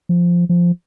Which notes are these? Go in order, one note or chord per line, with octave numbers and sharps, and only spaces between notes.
F3
F3